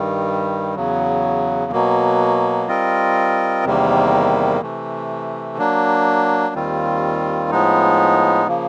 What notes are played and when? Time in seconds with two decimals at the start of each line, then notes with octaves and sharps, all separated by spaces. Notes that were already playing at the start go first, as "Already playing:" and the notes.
Already playing: G2 D#3 G3
0.75 E2 C#3 F#3
1.72 B2 F#3 A#3
2.68 G3 C4 F4 A#4 D#5
3.65 E2 C3 D#3 G3 A#3
4.62 C3 E3 A3
5.58 F#3 A#3 D4
6.54 D#2 D#3 G3 C4 F4
7.51 A2 F3 G#3 B3 D#4
8.47 C#3 F3 A#3